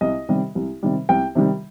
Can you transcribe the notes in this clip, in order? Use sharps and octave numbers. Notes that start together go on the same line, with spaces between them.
C2 D#5
C3 D#3 G3
C2
C3 D#3 G3
C2 G5
C3 D#3 G3